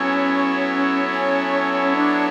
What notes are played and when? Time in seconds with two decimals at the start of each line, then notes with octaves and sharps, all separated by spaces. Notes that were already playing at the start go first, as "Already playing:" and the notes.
Already playing: F#3 B3 C#4 E4 A4 C#5
1.09 C#4
1.95 D4